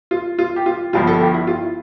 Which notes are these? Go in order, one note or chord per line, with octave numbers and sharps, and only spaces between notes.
F4
F4
G4
F4
G1 G2 F3 F4
A4
G4
E4
F4